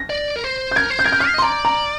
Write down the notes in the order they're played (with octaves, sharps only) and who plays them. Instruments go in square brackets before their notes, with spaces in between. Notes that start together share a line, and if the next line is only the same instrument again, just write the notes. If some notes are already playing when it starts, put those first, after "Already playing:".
Already playing: [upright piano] A#6
[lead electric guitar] D5
A#4
C5
[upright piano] G6
[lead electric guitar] A#4 [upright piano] G#6
[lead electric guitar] C5
[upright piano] G6
[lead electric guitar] A#4 [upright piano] G#6
[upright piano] G6
F6
[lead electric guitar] F5
D#5
[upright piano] C6
[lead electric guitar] D5 [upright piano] A#5
[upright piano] A#5